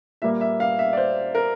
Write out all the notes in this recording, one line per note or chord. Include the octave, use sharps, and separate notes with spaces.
A#2 G3 A#3 E5
E5
F5
E5
D5
C5
A#4